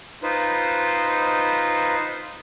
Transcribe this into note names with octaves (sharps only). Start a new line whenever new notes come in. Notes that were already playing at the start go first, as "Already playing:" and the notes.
D#4 F4 B4 C5